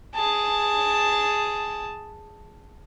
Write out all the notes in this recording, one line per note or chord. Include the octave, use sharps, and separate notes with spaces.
G#4 A5